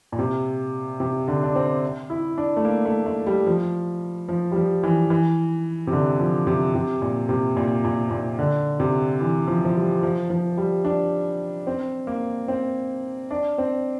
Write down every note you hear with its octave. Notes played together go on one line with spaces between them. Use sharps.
A#2
C3
C3
D3
D4
C4
E4
D4
A3
A#3
A3
A3
G3
F3
F3
G3
F3
E3
E3
C3
D3
F3
C3
C3
A#2
C3
A#2
A#2
A#2
D3
C3
E3
F3
F3
G3
F3
F3
G3
D4
C4
A#3
C4
D4
C4